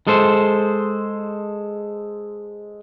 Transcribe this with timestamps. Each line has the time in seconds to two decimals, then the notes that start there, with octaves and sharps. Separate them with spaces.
0.07 G#3 A4 C5